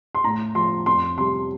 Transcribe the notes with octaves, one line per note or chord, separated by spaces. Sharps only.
C6
A2 A#5
F3 C6
F2 C6
C3 G3 C6